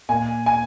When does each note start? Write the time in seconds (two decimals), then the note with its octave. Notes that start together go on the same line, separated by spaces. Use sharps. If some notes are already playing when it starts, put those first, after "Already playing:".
0.09 A#2 G#5
0.46 G#5